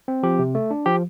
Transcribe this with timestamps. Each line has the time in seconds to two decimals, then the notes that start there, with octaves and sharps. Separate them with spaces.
0.08 C4
0.23 F3 G4
0.39 C3
0.55 A3
0.71 D4
0.86 F3 G4